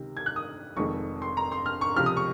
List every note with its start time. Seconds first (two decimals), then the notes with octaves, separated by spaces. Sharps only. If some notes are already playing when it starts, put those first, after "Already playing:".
Already playing: C#2 C3 D#3
0.17 G#6
0.26 F#6
0.36 D#6
0.76 F1 F2 D#3 G#3 C#6
1.22 C6
1.37 A#5
1.52 C6
1.66 F6
1.81 C#6
1.96 C#2 C3 F3 F6
2.06 D#6
2.17 C#6